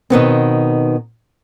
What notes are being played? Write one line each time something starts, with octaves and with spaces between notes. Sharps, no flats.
B2 D#3 B3 C4